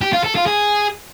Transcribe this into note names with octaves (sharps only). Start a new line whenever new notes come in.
G4
F4
A4
F4
G#4